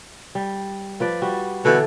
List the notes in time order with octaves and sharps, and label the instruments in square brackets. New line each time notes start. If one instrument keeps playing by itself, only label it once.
[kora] G3
F3 B4 D5
G3 F#4
[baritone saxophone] B2 [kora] D3 E3 A4